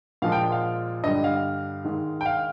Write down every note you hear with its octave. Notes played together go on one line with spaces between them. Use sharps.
A#2 F3 G#3 F5
G5
F5
G2 D3 G3 D#5
F5
G#2 D#3 G#3
G5
F5